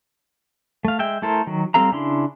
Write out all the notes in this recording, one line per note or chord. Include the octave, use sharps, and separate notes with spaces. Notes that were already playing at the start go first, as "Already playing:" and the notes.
A3 F5
G#3 E5 G5
A3 E4 A4 A#4 C5
D#3 F#3
G3 C4 A4 F5 A#5
C#3 C#4 D4 E4 C6